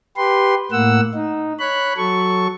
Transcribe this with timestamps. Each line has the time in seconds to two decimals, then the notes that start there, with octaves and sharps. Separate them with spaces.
0.17 G4 B4 C6
0.72 A2 A#3 F#5 E6
1.14 D#4
1.60 C#5 B5 F#6
1.97 F#3 A4 C#6